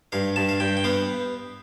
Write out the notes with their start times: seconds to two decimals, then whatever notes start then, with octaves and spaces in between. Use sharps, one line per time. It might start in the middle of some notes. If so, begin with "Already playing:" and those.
0.12 G2 F5
0.36 G2 A5
0.49 F5
0.60 G2 G5
0.77 G5
0.84 B3 F5